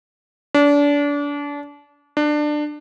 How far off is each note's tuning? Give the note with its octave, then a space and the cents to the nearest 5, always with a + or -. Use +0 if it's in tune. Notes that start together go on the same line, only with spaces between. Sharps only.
D4 -30
D4 +20